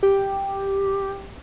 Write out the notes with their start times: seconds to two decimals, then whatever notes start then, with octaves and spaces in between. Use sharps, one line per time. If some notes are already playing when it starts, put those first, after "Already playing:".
0.03 G4